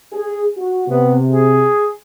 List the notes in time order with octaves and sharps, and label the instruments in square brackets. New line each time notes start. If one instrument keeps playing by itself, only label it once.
[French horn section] G#4
F#4
[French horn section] C3 [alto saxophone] B3
[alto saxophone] G#4